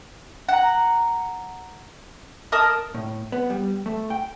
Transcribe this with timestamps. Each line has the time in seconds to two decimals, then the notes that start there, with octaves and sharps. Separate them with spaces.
0.49 F#5 A#5
2.52 A#4 D#5 A5 D#6
2.94 A2
3.32 B3
3.50 G3
3.86 A3
4.10 G5